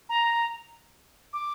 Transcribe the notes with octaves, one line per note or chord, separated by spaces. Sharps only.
A#5
D6